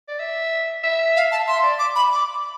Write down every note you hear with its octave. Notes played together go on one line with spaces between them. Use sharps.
D5
E5
E5
F5
A5
E5 C6
D5
D6
B5
D6